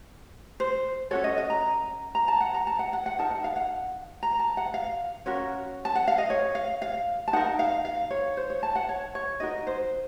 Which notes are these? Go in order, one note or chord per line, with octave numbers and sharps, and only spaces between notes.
C5
C#4 F#4 A4 C#5
D#5
D#5
A#5
A#5
A5
F#5
A#5
A5
F#5
F#5
F#5
D#4 A#4 A5
F#5
F5
F#5
A#5
A5
F#5
F5
C#4 F#4 A#4 C#5
A5
F#5
F5
D#5
C#5
F5
F5
A5
D#4 A#4 F#5
F5
F5
C#5
C5
C#5
A5
F#5
C#5
C#5
D#4 F#4 A#4 D#5
C5